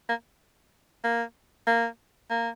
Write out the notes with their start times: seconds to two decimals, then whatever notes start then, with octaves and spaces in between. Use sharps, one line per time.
0.09 A#3
1.04 A#3
1.67 A#3
2.30 A#3